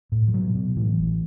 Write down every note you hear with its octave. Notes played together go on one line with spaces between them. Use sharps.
A2
F3
B2 F#3
B2
A2 E3
A1